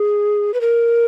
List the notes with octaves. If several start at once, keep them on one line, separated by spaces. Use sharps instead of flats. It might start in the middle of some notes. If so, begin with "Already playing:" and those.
Already playing: G#4
B4
A#4